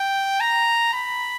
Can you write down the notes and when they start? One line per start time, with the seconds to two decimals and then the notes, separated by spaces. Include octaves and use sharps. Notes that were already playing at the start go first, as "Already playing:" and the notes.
Already playing: G5
0.40 A#5
0.94 B5